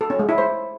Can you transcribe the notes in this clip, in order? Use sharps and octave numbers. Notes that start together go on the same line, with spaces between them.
A4
C#4
G#3
E4
C5